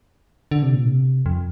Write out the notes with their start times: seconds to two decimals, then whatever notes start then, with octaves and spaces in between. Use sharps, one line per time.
0.51 D3
0.63 C3
0.74 A#2
0.85 C3
1.26 F2